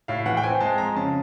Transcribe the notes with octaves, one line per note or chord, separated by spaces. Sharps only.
A2 F5
E3 F#5
G5
C4 G#5
G#3 A5
F2 A#5
C#3 A5